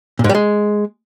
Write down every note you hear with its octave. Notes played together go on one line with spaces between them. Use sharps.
A#2
G#2
G3
G#3